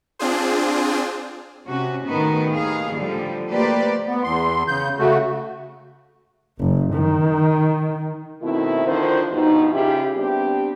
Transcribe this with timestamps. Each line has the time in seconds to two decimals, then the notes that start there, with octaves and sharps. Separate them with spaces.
0.19 C4 D4 F4 G#4 C5
1.67 C3 C#4 F#4
2.06 A2 D#3 B3 F#4
2.52 D#2 G#4 F5
2.93 A2 D3 F3 G3
3.49 A3 A#3 G4 B4 C5 D5
4.07 B3
4.23 E2 C6
4.68 C#3 G6
4.98 C#3 A3 F#4
6.59 F#1
6.94 D#3
8.42 B2 D#3 A3 C4 E4
8.86 D3 D#3 F3 F4 C5
9.32 G2 B2 F3 D#4
9.73 C#3 E4 F4 G4
10.16 G3 B3 C4 D4 G4